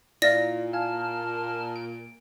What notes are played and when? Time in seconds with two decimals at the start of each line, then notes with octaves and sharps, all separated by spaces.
0.22 A#2 E4 D5 F5 A#6
0.73 F5 G#5 A5 F6
1.76 D7